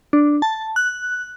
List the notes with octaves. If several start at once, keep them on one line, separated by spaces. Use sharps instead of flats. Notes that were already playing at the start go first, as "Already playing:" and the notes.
D4
A5
F#6